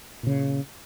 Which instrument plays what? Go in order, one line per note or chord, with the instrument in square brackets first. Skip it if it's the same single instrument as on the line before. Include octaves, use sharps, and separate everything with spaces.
[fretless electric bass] A#2 C#3